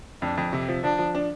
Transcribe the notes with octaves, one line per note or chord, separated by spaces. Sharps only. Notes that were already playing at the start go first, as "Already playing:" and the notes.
F2 D4
F2
C3
F3
F3 D4
F3
D4